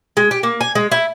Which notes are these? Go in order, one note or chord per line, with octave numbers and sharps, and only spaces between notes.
G#3
G4
A#3
G#5
G#3
E4